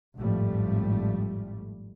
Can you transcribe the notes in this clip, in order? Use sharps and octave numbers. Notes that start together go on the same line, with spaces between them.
G#1 F2 A2 F3 G3 A3